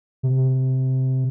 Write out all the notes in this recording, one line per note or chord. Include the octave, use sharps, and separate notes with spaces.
C3